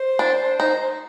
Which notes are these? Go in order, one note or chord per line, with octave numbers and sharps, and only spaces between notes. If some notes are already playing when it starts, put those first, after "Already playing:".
Already playing: C5
D4
D#4